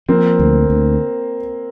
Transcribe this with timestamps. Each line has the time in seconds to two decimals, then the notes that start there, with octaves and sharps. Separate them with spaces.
0.09 F3 A#3 C4
0.39 D2
0.70 D2